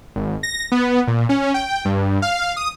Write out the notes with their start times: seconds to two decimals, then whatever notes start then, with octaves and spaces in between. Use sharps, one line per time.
0.16 G#1
0.43 A#6
0.72 B3
1.07 A#2
1.29 C#4
1.54 G5
1.85 G2
2.22 F5
2.56 D#6